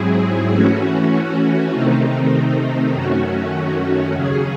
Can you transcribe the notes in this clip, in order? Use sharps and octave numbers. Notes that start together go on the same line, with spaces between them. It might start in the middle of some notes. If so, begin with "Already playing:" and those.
Already playing: G#2 F#3 C4 E4 G#4
E3 A3 C#4 F#4
C3 D#3 A3 C4 D#4
F#2 D#3 A3 C#4 F#4
D#2 C#3 F#3 C#4 G#4